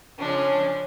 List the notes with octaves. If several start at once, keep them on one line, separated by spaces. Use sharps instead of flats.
C#3 F3 G#3 C#4 D4